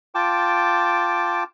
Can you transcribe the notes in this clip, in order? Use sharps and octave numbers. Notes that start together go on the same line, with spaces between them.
F4 G5 A5 D6